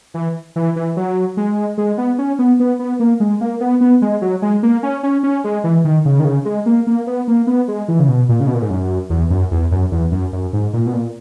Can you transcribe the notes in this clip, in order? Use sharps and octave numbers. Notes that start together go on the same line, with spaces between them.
E3
E3
E3
F#3
G#3
G#3
B3
C#4
B3
B3
B3
A#3
G#3
A#3
B3
B3
G#3
F#3
G#3
A#3
C#4
C#4
C#4
G#3
E3
D#3
C#3
D#3
C#3
G#3
A#3
A#3
B3
A#3
B3
G#3
E3
C#3
B2
A#2
C#3
B2
A#2
G#2
F#2
E2
F#2
E2
F#2
E2
F#2
F#2
G#2
A#2
B2
A#2